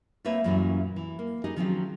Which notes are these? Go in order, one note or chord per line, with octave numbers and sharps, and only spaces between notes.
A3 A#3 C4 B4 C#5 E5
F#2 A#2 E3 G3 C#4 F#4
E3
A#3
D#4 G4 G#4 D#5
D#3 F3 F#3 C4 C#4 F4